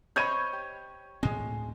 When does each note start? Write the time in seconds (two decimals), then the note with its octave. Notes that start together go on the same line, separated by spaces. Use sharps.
0.16 C5 C#5 D#5 B5 G6 G#6 D#7
0.53 G4
1.23 D2 A2 G#3 C4